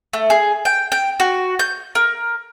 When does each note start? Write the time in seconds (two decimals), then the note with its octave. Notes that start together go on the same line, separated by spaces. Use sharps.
0.13 A3
0.30 G#4
0.65 G5
0.92 G5
1.20 F#4
1.59 G6
1.95 A#4